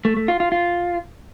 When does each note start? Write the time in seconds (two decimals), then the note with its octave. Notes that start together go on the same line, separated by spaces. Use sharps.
0.05 A3
0.17 A3
0.28 F4
0.40 F4
0.52 F4